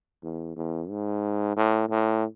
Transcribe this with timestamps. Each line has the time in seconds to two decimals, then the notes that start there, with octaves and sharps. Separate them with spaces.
0.23 E2
0.56 E2
0.90 G#2
1.56 A2
1.89 A2